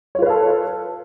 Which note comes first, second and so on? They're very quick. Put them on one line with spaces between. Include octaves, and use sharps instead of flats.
C#5 F4 B4 F5 A4